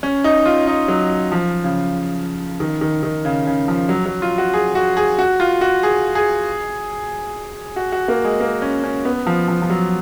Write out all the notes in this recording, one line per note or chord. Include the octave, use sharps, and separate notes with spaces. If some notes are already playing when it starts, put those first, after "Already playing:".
C#4
D#4
F4
D#4
F#3
F3
C#3
D#3
D#3
D#3
C#3
C#3
F3
F#3
F#3
F4
F#4
G#4
F#4
G#4
F#4
F4
F#4
G#4
G#4
F#4
F#4
A#3
G#3
A#3
C#4
C#4
B3
F3
F3
F3
F#3